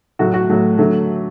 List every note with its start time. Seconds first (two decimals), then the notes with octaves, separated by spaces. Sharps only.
0.19 A2 F#3 A3 F#4
0.34 F#4
0.49 A2 F#3 A3
0.78 D3 F#3 A3